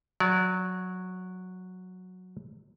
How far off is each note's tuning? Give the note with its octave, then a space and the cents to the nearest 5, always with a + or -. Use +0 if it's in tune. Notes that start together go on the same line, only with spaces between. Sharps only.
F#3 -10 D5 -40